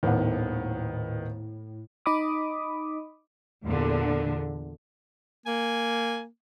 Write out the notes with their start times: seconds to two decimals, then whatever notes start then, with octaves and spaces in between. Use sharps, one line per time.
0.03 D#1 A2 D#3 B3 F#5
2.06 D#4 D#5 B5 D6 D#6
3.64 E2 A#2 D3
5.46 A#3 G#5